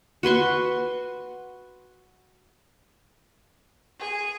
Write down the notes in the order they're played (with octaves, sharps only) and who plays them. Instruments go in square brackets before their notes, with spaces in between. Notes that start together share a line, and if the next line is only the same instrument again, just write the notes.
[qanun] F#4 B4 C6 C#6
[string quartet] G#4